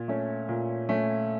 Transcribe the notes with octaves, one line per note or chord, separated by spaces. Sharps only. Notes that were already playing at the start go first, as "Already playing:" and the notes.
Already playing: A#2
A3 C#4
A#2
A3 C#4